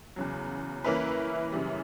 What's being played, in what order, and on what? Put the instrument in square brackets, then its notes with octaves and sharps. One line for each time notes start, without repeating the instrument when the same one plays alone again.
[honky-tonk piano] E2 C#3 F#3
E3 A#3 C#4 E4 B4
F#2 C#3 E3 G3